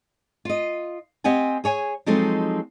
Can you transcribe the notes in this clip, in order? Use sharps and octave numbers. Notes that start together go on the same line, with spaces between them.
F4 D#5
C4 G4 D#5 F#5 G#5
G#4 C#5 G#5
F3 F#3 G#3 C4 D#4 A4